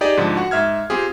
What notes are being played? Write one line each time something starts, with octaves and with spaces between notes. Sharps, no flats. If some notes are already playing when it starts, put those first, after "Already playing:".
D#4 G4 G#4 D5 D#5
G#2 D3 F3
F#4 F#5 C#6
G#2 E5 F6 G#6
C4 F4 G4 G#4